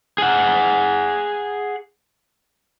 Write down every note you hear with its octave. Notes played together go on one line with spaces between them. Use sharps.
G#4 F#5